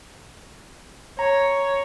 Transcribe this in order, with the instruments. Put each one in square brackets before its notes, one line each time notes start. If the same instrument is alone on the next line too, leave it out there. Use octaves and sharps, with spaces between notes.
[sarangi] C#5 [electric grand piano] A#5